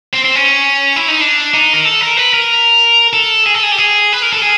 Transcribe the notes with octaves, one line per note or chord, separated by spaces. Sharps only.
C4
C4
C#4
E4
D#4
D4
D#4
A#4
A4
A#4
B4
A#4
A4
G#4
A4
G#4
G4
G#4
B4
A#4
A4
G#4